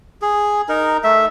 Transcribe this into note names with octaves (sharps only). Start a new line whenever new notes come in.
G#4
D#4 A#4
A3 E5